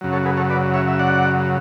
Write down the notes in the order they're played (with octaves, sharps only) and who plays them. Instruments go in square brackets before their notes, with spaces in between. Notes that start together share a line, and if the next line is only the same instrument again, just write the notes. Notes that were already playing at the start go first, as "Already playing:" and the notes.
[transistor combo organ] F#2 C#3 F#3
A4 C#5
G#4 B4
A4 C#5
B4 D5
C#5 E5
E5
D5 F#5